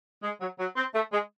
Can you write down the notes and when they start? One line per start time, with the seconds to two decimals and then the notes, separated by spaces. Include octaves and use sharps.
0.23 G#3
0.40 F#3
0.58 F#3
0.76 C4
0.93 A3
1.12 G#3